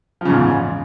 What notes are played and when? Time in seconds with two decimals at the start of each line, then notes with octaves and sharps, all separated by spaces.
0.21 F3
0.25 C#3
0.30 G#2
0.34 E2